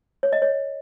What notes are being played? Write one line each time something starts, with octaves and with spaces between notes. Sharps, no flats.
C#5
D#5
C#5